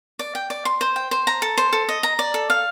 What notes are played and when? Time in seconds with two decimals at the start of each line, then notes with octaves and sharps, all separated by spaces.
0.19 D5
0.35 G5
0.50 D5
0.65 C6
0.81 C5
0.96 G5
1.11 C5
1.27 A#5
1.42 A4
1.58 C5
1.73 A4
1.89 D#5
2.03 A#5
2.19 D5
2.34 A4
2.50 F5